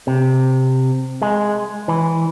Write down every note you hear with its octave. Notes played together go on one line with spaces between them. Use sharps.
C3
G#3
E3